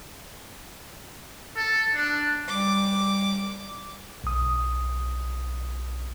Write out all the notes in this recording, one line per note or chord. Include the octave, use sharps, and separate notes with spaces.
A4
D4
G3 D6
B1 D#6